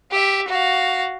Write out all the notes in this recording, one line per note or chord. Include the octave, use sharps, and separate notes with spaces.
G4 E5
F#4 F5